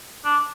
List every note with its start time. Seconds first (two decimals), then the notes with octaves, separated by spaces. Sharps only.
0.25 D4